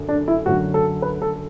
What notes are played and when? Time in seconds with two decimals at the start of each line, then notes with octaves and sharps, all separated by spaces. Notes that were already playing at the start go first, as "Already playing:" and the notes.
Already playing: F#2 D3 F#3
0.09 D4
0.28 E4
0.46 F#2 D3 F#3 F#4
0.74 A4
1.02 B4
1.22 A4